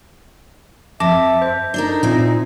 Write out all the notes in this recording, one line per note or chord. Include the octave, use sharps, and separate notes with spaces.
F2 E5 A5 D6 A#6
C5
D4 D#4 A4 A#4
A#2 C4 E4